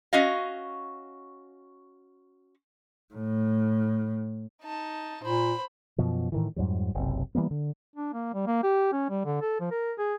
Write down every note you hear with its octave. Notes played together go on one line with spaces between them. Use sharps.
C#4 F#4 D#5 F5
A2
D#4 A5
A#2 C5 B5
F#2 B2 F3
A2 D#3 E3
F2 G#2 F#3 G3
F#1 B1 C3
E3 G3 A#3 B3
D3
D4
A#3
G3
A#3
G4
C#4
G3
D3
A4
F3
A#4
G#4